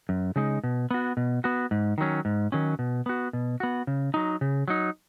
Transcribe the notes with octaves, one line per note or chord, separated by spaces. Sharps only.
F#2
C#3 G#3 D#4
B2
B3 F#4
B2
B3 F#4
G#2
D#3 F#3 C#4
G#2
D#3 F#3 C#4
B2
B3 F#4
B2
B3 F#4
C#3
F#3 D#4
C#3
F#3 D#4